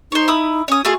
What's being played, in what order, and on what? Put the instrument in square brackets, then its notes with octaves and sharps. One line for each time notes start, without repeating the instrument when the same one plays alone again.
[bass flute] D#4 [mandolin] C5 C#5
[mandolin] E4 B5 D#6
[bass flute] C#4 [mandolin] C#5 D#6
[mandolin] A3 F4 G#4 [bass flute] F#4